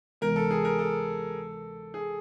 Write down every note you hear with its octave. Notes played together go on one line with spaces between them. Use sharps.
D2 C3 E3 G#3 B3 A#4
A4
G#4
A#4
A4
G#4